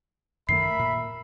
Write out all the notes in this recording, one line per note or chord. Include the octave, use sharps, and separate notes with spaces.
F#2 D#3 A3 A#4 E5 B5 C7
A#2